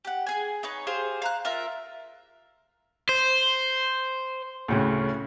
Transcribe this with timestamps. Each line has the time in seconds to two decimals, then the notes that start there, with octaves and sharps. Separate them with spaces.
0.05 G4 F#5
0.26 G#4 G#5
0.63 D#4 B4 C#5
0.87 G4 G#4 C5 F5
1.22 F5 A#5 F#6
1.45 F4 A#4 E5
3.09 C5
4.68 D2 A2 C#3